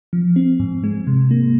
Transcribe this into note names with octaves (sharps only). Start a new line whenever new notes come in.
F3
C4
G#2
G#3
C3
A#3